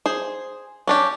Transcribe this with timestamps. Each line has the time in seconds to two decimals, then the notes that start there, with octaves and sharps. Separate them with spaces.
0.06 G#4 C5
0.87 C#4 D4 G4